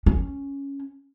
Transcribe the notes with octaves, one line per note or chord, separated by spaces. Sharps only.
C#4